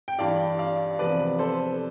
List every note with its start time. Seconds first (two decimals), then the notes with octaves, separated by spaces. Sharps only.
0.08 G5
0.18 G2 E3 G3 D5 F5
0.59 D5 F5
0.99 E2 C3 F3 B4 D5
1.39 A4 C5